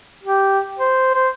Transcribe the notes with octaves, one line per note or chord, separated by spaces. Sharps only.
G4
C5
C5